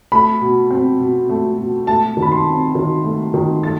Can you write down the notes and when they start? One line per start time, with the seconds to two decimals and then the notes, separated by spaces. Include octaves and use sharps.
0.12 A3 B5
0.41 B2
0.71 C4
1.00 B2
1.29 A3
1.58 B2
1.87 A3 A5
2.17 D#3
2.22 B5
2.32 C6
2.47 C4
2.75 D#3
3.04 A3
3.34 D#3
3.63 A3 A6